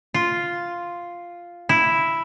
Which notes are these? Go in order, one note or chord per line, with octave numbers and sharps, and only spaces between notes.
F4
E4